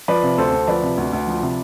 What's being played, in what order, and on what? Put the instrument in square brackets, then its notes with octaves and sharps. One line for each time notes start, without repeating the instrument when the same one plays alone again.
[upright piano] F3 B4 D5
C3
D2 A4 C5
D2
F3 B4 D5
C3
D2
D2
F3
C3